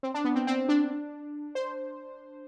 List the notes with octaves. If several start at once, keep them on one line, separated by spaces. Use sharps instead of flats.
C4
D4
B3
C4
C4
D4
C5